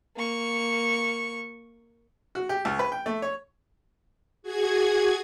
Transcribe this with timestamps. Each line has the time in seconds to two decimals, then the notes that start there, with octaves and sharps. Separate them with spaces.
0.16 A#3 C#6
2.35 F#4
2.49 G4
2.65 C#2
2.79 B4
2.92 G5
3.06 A3
3.22 C#5
4.43 F#4 G#4 G#6